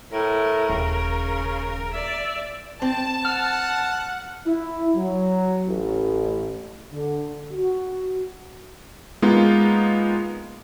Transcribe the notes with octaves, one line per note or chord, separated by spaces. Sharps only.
A2 A#4
D#1 C#3
D5 E5
C4 A5
F#5 F6
E4
F#3
A1
D3
F#4
G#3 A#3 B3 D#4 F4